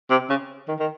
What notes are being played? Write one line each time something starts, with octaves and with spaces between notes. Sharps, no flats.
C3
C#3
D#3
D#3